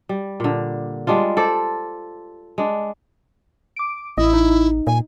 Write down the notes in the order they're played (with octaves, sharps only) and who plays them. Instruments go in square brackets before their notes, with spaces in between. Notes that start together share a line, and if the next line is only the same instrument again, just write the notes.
[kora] G3
A#2 D3
G3 G#3 D4 F4
A4 C5 D5
G#3 D4
[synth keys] D6 D7
[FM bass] A1 [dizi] E4 [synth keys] D#5 D#6
[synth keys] D#4
[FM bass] A#2 [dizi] G#5